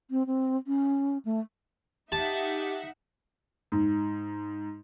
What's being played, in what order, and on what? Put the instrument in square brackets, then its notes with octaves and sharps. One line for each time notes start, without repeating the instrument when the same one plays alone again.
[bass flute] C4
C4
C#4
A3
[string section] D#4 E5 F#5 [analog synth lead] G4 [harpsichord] A5
[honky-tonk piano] G#2